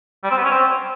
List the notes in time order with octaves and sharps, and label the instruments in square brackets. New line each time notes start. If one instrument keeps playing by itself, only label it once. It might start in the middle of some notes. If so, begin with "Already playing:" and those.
[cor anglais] G3
C4
B3
C#4
C4